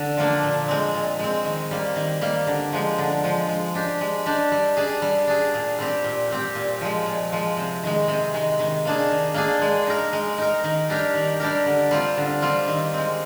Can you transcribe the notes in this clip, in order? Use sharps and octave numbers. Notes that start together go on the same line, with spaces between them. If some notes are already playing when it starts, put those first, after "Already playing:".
Already playing: D3
F3 A#3 D4
A#2
G#3 C4
A#2
G#3 C4
D#3
G3 A#3
D#3
G3 A#3
D3
F3 G#3
D3
F3 G#3
G#3
D4 G4
G#3
D4 G4
G3
D4 G#4
G3
D4 G#4
A#2
G3 C4 G4
A#2
G3 C4 G4
A#2
F3 G#3
A#2
F3 G#3
C3
D#3 G#3
C3
D#3 G#3
D#3
A#3 D4 G#4
D#3
A#3 D4 G#4
G#3
D#4 A#4
G#3
D#4 A#4
D#3
G3 D4 G4 A#4
D#3
G3 D4 G4 A#4
D3
G3 C4 F4
D3
G3 C4 F4
D#3
G#3 C4